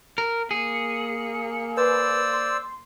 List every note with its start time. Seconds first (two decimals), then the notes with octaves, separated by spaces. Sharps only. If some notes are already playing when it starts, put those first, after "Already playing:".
0.18 A#4
0.51 A#3 G#4 C#7
1.77 B4 C5 D5 E6
2.33 C6